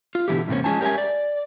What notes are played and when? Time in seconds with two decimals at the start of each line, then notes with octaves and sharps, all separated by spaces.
0.15 F4
0.28 B2 D3 E3 E4 G4
0.48 E2 G#2 C3 A#3 C#4
0.64 F3 G#3 C#4 F4 G#5 A5
0.81 G4 A#4 C#5 D#5 E5 G#5
0.98 D5